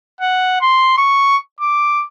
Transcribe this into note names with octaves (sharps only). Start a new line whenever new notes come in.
F#5
C6
C#6
D6